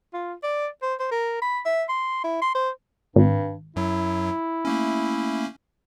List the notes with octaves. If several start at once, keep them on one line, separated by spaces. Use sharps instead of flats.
F4
D5
C5
C5
A#4
B5
E5
C6
E4
C6
C5
G#1 G2
F#2 F#3 E4
A3 A#3 C#4